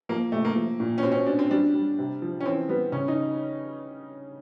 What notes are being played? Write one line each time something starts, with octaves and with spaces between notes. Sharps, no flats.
F3 A#3
C3 A3
A#3
F3
A#2
C#4
B2 C4
C#4
C4
B2 D4
C4
G3 D4
G3
C3
F3
C#4
E3 C4
G3 B3
C#3 C#4
D#4